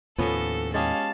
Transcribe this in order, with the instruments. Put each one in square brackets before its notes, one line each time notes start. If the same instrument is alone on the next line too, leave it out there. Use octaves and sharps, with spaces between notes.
[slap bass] D#2 A2 [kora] F3 B3 C#4 [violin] A4
[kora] G#3 G4 G#4 [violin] C#4 F5 [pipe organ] A5